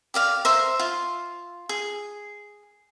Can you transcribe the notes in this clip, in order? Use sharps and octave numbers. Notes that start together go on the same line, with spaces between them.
G4 D5 F5
C5 E5 A#5
F4
G#4